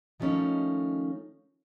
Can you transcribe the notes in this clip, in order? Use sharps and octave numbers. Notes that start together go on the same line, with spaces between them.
D#3 F3 G3 A3 C#4 D#4